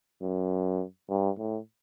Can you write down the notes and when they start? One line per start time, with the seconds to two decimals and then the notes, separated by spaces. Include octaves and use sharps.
0.22 F#2
1.09 G2
1.38 A2